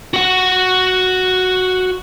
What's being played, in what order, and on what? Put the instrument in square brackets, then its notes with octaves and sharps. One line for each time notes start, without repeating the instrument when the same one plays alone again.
[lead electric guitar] F#4 F#5